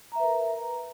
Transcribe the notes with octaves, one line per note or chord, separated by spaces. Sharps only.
A#4 B4 E5 A#5